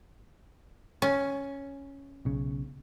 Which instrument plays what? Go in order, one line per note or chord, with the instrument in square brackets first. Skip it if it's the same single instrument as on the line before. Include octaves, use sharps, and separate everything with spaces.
[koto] C#4
[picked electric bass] B1 C#3